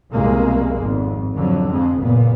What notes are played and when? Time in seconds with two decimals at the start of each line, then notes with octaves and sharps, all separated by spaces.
0.12 C2 F2 B2 G#3 A#3
0.78 G#1 F2
1.34 F2 D3 F#3
1.69 F2 G#3
2.00 F#1 A#2 B3